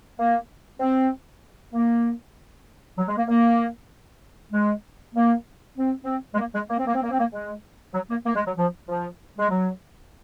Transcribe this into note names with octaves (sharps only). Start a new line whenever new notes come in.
A#3
C4
A#3
F#3
G#3
A#3
A#3
G#3
A#3
C4
C4
G#3
A#3
G#3
A#3
C4
A#3
C4
A#3
C4
A#3
G#3
F#3
A#3
A#3
G#3
F#3
F3
F3
G#3
F#3